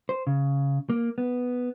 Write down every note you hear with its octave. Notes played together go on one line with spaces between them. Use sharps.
C5
C#3
A#3
B3